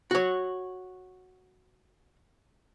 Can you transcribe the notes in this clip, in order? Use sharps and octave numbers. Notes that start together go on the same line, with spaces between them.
F#4 C#5